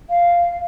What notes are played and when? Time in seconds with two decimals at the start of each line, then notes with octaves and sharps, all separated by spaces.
0.10 F5